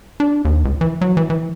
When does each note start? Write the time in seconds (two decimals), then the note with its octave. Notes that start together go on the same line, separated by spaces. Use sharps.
0.20 D4
0.45 D#2
0.65 C#2
0.81 E3
1.01 F#3
1.17 E3
1.30 E3